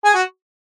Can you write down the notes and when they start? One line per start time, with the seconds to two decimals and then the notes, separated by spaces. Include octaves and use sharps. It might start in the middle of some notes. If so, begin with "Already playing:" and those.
0.05 G#4
0.14 F#4